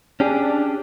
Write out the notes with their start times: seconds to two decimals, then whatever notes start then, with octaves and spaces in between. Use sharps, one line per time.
0.20 C#4 D4 G4 G#4